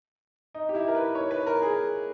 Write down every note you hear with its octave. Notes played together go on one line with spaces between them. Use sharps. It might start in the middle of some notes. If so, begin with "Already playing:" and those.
D#4
G4
E4
A#4
B4
C#5
B4
A#4
G#4